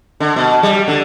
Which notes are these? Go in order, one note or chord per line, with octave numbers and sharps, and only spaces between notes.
D3
B2
G3
D3